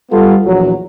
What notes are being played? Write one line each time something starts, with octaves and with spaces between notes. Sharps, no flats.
G3 B3 F4 A4
A#1 E2 F#3